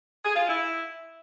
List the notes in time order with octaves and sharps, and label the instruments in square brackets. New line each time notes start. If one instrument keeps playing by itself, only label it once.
[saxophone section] G#4
F4
E4